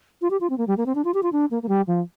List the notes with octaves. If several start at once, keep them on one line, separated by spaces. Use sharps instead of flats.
F4
G4
F4
C4
A#3
G3
A#3
C4
D4
F4
G4
F4
D4
A#3
A#3
G3
F3